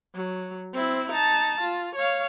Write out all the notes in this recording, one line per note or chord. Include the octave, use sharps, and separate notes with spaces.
F#3
C4 E4
D#4 A5
F4
C#5 F5